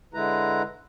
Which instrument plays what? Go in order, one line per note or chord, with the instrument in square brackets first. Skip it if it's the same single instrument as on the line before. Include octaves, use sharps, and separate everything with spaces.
[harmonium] D3 G#3 E4 B4 A#5